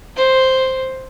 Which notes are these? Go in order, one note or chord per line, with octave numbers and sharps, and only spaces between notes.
C5